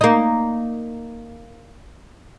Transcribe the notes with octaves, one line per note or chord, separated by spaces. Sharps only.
A#3 D#4